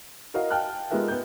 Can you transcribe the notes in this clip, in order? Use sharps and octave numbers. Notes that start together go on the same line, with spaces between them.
E4 F#4 A#4 D#5 F5
F5 G5 A5 F6 F#6
G#3 B3 F4 G4 A#4 E5
B3 G6